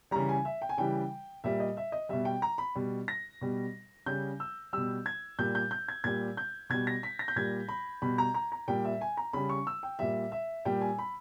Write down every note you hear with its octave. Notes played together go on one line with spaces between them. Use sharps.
C#3 E3 G3 A#5
G#5
E5
G5
G#5
C#3 E3 G3 G5
A#2 G3 E5
D#5
E5
D#5
B2 G3 E5
G5
A#5
B5
B2 G3
A#6
B2 G3
C#3 G3 G6
E6
B2 G3 E6
G#6
A#2 G3 G6
G6
G6
G#6
A#2 G3 G#6
G6
B2 G3 G#6
A#6
B6
A#6
G6
A#2 G3 G#6
B5
B2 G3 B5
A#5
A#5
A#5
A#2 G3 G5
E5
G#5
A#5
C#3 G3 B5
C#6
E6
G5
A#2 G3 E5
E5
A#2 G3 G5
G#5
B5